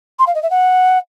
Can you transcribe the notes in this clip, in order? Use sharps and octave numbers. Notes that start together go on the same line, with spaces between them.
C6
F5
D#5
E5
F#5